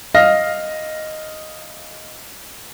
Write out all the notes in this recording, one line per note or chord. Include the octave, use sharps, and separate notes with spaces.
D#5 F5 F6 A#6